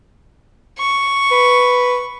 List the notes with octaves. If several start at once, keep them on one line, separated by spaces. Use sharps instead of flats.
C#6
B4